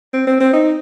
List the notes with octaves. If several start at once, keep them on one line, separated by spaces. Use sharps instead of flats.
C4
C4
C4
D#4